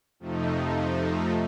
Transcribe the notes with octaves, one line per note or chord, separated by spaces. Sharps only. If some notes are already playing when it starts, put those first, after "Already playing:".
F2 C3 F3 A3 D#4